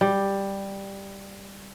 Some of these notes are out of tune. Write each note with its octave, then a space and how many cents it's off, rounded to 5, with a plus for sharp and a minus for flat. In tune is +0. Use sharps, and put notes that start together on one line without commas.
G3 +5